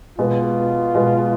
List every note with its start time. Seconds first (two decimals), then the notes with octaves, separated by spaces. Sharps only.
0.18 B2 G#3 B3 F4
0.95 B2 G#3 B3